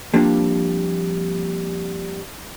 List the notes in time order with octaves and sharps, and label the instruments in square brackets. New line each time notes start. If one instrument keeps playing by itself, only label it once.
[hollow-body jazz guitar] F3 G3 A#3 C4 D4 G4